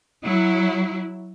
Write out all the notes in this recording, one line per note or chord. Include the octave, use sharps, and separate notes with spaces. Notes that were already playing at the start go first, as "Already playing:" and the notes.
F#3 E4